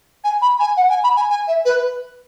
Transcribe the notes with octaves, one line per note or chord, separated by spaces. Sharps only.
G#5
B5
G#5
F#5
G#5
B5
G#5
G#5
E5
B4